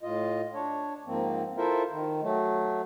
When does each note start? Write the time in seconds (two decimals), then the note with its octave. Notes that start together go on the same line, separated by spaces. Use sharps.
0.03 A2 F4 D#5
0.54 D4 C#5
1.06 G#2 F3 A#3 C4
1.57 E4 F4 A4 A#4 C5 E5
1.91 D#3
2.22 F#3 A3